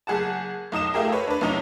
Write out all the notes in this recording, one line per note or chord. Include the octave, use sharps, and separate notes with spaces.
F#1 G#4 F#5 A5
B1 D#4 D#6 E7
A3 F4 G4 G#4 A#4
B4 C#5
D4 B4
B1 C3 C#4 D#4 F7